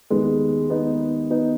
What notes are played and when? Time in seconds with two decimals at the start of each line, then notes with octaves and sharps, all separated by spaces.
0.10 D#2 D#3 G#3 B3
0.70 B3 D#4
1.30 B3 D#4